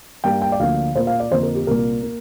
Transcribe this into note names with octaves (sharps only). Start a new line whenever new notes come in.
G2 G3 A#3 G5
G5
D5
D2 D3 F3 A#3 F5
A#2 A#3 C5
F5
D5
F2 D3 A#3 C5
A#4
G4
C2 A#2 A#3 A#4
A#3